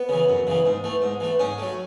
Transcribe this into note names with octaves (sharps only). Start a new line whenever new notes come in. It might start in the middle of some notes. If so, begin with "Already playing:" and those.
Already playing: B3
C#3 E3
F#2
C#3 E3
G#2
E3 A3
G#2
E3 A3
G#2 C#4
F#3 A3